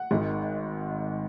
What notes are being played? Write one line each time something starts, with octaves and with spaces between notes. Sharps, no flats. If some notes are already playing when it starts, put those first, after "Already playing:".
Already playing: F#5
G#1 G#2 D#3